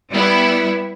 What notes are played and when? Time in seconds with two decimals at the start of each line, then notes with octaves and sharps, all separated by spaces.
0.12 G3 B3 E4